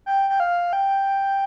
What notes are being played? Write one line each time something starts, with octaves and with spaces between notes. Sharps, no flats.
G5
G5
F5
G5